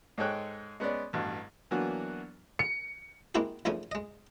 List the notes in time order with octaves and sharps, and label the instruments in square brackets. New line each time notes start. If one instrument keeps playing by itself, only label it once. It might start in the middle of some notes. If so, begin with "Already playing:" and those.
[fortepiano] G#2 G#3 A4 C#5 G5 F#6
G#3 B3 C#4 D5
A1 G2 B2
E3 F#3 A#3 B3 D4 F#4
[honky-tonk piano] C#7
[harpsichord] G#3 A#3 C4 E4 F#4 G4
B1 A#2 C#3 F3 A3 G#5
G#3 D#5